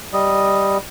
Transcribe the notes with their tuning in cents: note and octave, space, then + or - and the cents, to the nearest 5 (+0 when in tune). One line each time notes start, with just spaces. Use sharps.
G3 +0 D#5 +0